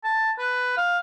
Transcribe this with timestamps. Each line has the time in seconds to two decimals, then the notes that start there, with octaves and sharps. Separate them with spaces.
0.04 A5
0.39 B4
0.77 F5